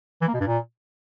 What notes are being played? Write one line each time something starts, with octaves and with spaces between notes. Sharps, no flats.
E3
A#3
B2
G2
A#2